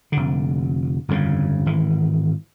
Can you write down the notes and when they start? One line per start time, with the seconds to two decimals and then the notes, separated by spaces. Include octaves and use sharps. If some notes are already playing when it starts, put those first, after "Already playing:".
0.12 F1 D3
1.08 G1 F2 G#2 C#3
1.66 G#1 E3